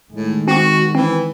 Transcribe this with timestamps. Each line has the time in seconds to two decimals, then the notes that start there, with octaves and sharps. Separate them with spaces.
0.13 A2 D#3 G#3
0.48 C4 F#4 C#6
0.95 E3 C4